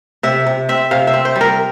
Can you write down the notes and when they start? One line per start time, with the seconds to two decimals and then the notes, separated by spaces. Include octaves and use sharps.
0.23 C3 E5
0.47 C3
0.69 C4 E5
0.91 C3 F5
1.07 E5
1.14 C4
1.25 C5
1.36 G3
1.41 A#4